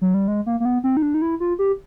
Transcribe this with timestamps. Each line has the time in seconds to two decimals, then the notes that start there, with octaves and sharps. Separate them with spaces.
0.01 F#3
0.14 G3
0.28 G#3
0.46 A#3
0.60 A#3
0.65 B3
0.84 C4
0.97 D#4
1.02 D4
1.14 D#4
1.22 E4
1.40 F4
1.59 G4